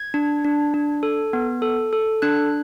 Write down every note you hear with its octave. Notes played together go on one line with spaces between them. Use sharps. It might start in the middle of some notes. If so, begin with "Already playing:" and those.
Already playing: G#6
D4
D4
D4
A4
B3
A4
A4
D4 F#6